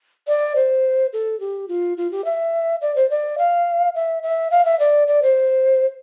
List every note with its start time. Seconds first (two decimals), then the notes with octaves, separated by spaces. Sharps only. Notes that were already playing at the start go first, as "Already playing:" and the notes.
0.28 D5
0.56 C5
1.13 A4
1.40 G4
1.68 F4
1.98 F4
2.11 G4
2.25 E5
2.82 D5
2.96 C5
3.10 D5
3.38 F5
3.95 E5
4.23 E5
4.51 F5
4.65 E5
4.79 D5
5.08 D5
5.22 C5